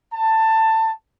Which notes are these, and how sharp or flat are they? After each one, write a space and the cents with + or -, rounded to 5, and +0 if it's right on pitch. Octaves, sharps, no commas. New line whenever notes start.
A5 +15